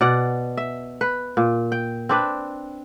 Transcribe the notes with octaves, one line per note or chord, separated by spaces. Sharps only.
B2 D5 F#5
E5
B4
A#2
G5
C4 D4 B4